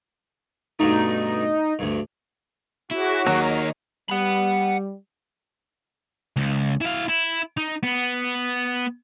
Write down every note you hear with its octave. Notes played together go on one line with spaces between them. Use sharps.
G2 B2 A3 D#4
D2 G2
E4 F#4 G#4 C#5 D6
D#3 F#3 A#3 C#5 D#5 A#5
G3 F#5 B5
C#2
E4 F5
E4
D#4
B3